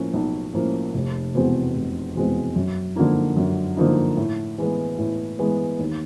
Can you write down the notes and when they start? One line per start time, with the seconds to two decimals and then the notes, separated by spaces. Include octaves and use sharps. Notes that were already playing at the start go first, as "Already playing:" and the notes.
Already playing: A2 F3 A#3 C#4
0.14 B1
0.53 A2 F3 A#3 C#4
0.94 F1
1.35 E2 B2 G#3 C4
1.75 F1
2.16 E2 B2 G#3 C4
2.56 F#2
2.96 D3 F3 A#3 D#4
3.37 F#2
3.77 D3 F3 A#3 D#4
4.17 A2
4.58 E3 G#3 B3
4.98 A2
5.39 E3 G#3 B3
5.79 D#2